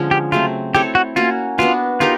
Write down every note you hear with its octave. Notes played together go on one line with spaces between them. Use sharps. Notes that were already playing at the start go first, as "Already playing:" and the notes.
Already playing: D3 F3 G#3 C#4
G4
C#3 F#3 A3 C4 F4
C4 E4 G4 A4 C#5
F#4
A#3 C#4 F4 F#4
B3 D4 F4 F#4 B4
B3 D#4 F4 G4 A#4